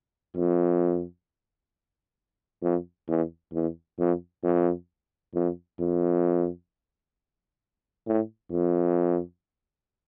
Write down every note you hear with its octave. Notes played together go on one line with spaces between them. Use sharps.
F2
F2
E2
E2
F2
F2
F2
F2
A2
F2